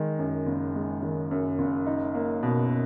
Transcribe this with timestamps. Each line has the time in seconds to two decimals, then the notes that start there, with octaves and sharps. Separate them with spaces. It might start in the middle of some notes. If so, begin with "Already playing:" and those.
Already playing: D#3 G#3
0.19 F#2
0.47 F#1
0.75 G#3
1.03 D#3
1.31 F#2
1.59 F#1
1.87 D#4
2.15 A#3
2.43 B2